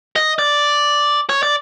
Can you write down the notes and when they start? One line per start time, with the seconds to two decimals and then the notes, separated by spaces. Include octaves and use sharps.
0.16 D#5
0.39 D5
1.29 C#5
1.43 D5